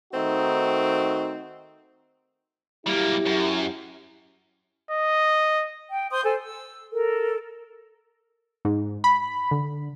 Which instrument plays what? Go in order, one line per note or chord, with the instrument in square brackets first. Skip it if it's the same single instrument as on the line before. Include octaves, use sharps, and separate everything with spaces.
[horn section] D#3 A3 C4 D#4 F#4
[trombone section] F#3 E4 G4 [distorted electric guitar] G3 A#3
[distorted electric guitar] F#2
[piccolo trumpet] D#5
[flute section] G5
C5 C6 D#6 G6
A4 C5 G#5
E6
A4 A#4
[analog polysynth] G#2
B5
D3